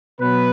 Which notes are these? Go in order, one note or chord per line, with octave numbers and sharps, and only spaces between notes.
B2 F#3 B4